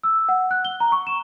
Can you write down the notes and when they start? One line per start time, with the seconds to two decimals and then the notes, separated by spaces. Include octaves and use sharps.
0.04 E6
0.29 F#5
0.51 F#6
0.65 G7
0.80 A#5
0.92 C#6
1.07 E7